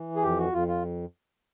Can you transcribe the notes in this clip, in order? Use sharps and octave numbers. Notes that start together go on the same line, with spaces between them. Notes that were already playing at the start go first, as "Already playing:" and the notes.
Already playing: E3
G#4
F2 G4
F#4
F2 F4
F4